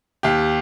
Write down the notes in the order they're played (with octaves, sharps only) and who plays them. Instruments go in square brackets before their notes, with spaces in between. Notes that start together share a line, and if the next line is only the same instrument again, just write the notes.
[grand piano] D#2 G4